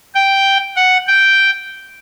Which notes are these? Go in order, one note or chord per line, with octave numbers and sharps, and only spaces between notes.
G5
F#5
G5